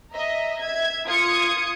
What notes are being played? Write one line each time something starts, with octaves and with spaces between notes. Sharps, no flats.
D#5 E5 A#5
E5 G#6
F4 D#6 G#6 C#7